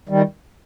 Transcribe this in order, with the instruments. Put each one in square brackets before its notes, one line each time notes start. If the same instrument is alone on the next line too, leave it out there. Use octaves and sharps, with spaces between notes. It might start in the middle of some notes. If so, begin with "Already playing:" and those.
[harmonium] D#3 G3